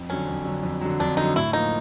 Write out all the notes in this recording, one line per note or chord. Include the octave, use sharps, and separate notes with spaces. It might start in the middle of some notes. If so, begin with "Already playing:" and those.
Already playing: F2
D3 F#3 C#4
F2
D3 F#3
F2
D3 F#3
F2 D4
D3 F#3 D#4
A2 E4
F3 A#3 D#4